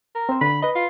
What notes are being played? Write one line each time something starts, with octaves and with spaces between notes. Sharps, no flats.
A#4
C4 C5
D3 B5
B4 D#5 B5
F4